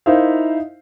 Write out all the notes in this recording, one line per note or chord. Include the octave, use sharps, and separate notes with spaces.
D#4 E4 A#4 C5 E5 F5